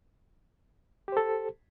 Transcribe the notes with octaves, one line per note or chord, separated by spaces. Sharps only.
G4 A4 C5